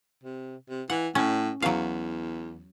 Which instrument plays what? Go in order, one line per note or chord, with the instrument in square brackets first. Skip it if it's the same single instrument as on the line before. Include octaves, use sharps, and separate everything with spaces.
[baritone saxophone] C3
C3
[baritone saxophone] E3 [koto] F#5
[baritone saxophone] A2 [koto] C#4
[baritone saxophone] E2 [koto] F#3 F5